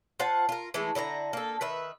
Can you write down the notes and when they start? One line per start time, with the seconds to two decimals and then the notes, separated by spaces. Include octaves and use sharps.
0.19 F4 C5 F#5 A5
0.49 F4 A#4
0.74 E3 G#3 A3 E4
0.95 D3 E4 D5 A#5
1.33 A#3 A4
1.61 D#3 B4 E5